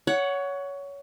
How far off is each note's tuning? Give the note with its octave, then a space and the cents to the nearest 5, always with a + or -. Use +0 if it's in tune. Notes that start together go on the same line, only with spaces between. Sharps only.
C#5 +20 F#5 +0